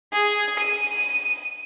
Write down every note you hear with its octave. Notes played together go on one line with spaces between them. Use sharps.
G#4
D#7